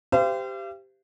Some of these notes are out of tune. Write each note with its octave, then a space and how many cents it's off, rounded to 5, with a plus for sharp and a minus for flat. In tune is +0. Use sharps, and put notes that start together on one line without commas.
G4 +0 C5 -30 F5 -45